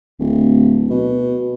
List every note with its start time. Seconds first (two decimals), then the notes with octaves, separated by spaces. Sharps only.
0.19 D1
0.90 B2